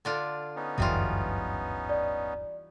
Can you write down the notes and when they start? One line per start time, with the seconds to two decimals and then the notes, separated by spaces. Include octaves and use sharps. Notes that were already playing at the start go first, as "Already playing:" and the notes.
0.05 D3 D4 F4
0.56 B3 C#4 D#4
0.78 D1 G1 F#2 E3 G3 F4
1.89 D5